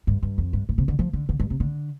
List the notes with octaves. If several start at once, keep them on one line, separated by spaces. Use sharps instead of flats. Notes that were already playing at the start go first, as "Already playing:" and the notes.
G2
G2
F2
G2
A2
C3
D3
F3
D3
D3
G2
C3
D3